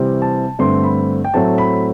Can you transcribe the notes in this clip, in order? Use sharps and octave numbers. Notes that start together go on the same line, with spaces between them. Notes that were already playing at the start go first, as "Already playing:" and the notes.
Already playing: C3 E3 G3 C4
A5
G2 D3 A3 C4 C6
B5
G5
A2 F#3 A3 C4 A5
B5